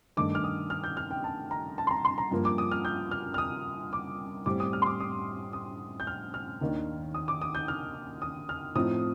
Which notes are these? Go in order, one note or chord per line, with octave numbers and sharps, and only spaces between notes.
G2 D#3 A3 D4 D6
F6
D#6
F6
G6
F6
G5
A5
A#5
A5
C6
A#5
C6
A#5
G2 F3 A#3
D6
D#6
F6
G6
F6
F6
D#6
D6
A2 G3 C4 D6
D#6
F6
C6
D6
D#6
D#6
G6
F6
F6
D#2 D#3 A#3 D4
D#6
D6
D#6
G6
F6
D#6
F6
A2 F3 C4 D#4 D#6